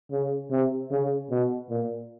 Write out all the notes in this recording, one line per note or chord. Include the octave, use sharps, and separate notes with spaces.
C#3
C3
C#3
B2
A#2